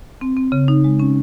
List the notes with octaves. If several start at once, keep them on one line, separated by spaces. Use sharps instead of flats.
C4
C4
C#3
D#4
G#3
C#4